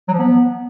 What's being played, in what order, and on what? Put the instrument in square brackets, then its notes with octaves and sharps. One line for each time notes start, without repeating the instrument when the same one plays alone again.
[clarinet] F#3
F3
B3